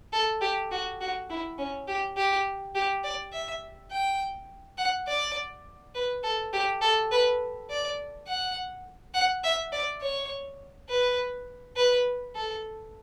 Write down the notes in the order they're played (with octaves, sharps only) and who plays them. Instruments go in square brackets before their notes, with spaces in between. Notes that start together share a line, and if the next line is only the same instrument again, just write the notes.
[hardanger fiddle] A4
G4
F#4
F#4
E4
C#4
G4
G4
G4
D5
E5
G5
F#5
D5
B4
A4
G4
A4
B4
D5
F#5
F#5
E5
D5
C#5
B4
B4
A4